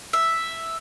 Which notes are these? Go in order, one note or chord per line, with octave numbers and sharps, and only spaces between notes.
E5